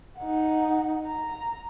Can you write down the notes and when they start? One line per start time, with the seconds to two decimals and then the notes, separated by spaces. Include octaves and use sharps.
0.18 D#4 F#5
1.06 A#5